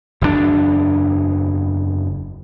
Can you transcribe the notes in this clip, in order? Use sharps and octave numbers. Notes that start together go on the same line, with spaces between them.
F#1 E2 G2 D4